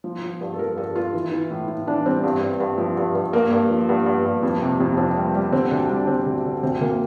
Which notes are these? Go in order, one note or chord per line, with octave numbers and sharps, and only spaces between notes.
F3
F3
G2
A4
F3 A#4
G2 A4
G2 F4
E3
E3
A2
A2
E3 D4
G3 C4
G2
G2
G2
F3
G2
G2
G2 A#3
G2
F3
G2
G2
G2
F2
C3
F2
F2 C4
G3
G3
D3 C4
D2 D4
G3 D4
D3 C4
D2
D3
D2 C4
D2 A#3